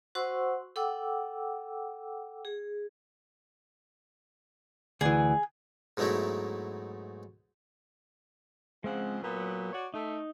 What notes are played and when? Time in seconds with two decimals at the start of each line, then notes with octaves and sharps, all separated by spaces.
0.15 F#4 C5 F#5 C6 C#6 E6
0.76 A4 F#5 G5 D6 E6
2.45 G#4
5.01 D2 E3 G#4
5.97 G#2 B2 F#3 A3 D#4 E4
8.84 C#3 F3 G#3 C4 F#5
9.22 A#2 F#3 B3
9.73 F#4 C#5 D5
9.94 A3 D#4